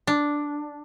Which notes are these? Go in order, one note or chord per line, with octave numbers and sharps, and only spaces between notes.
D4